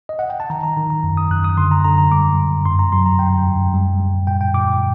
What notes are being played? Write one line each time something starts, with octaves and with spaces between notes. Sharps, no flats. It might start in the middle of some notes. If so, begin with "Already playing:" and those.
D#5
F#5
G5
A5
D#3 A#5
A#5
D#3
A#5
F#2
D#6
F#2 F#6
D#6
D3 C6
A#5
D3 A#5
A#5
G3 D6
G2
F#2 C6
A#5
F#3 C6
A#5
F#2 G5
F#2
G3
G3
A#2 G5
G5
A#2 D6